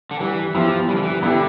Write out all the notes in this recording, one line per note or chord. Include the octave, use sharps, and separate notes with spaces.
D3
E3 G3
F3 B3 E4 G4
E3 G3
D3
E3
D3 B3 E4 G4